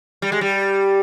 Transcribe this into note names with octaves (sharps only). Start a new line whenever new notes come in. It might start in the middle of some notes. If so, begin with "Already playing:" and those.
G3
G#3
G3